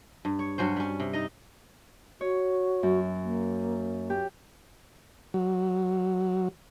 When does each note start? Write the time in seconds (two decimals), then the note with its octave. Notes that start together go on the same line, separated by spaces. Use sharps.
0.25 G2
0.39 C#5
0.58 G2 F#3 C#4 C5
0.76 G3 C#4
1.00 C3
1.13 D#4 D#5
2.21 F#4 C#5
2.83 F#2
3.24 A#3
4.10 G4
5.34 F#3